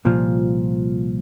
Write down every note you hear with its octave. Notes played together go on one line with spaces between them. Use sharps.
C2 A#2 F3